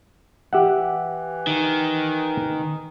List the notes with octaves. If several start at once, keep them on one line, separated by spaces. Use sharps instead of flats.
E3 G4 E5 F#5
D#3